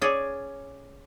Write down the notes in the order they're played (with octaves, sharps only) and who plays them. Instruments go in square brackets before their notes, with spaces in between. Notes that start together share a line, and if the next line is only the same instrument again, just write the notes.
[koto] C#4 G#4 C#5 D5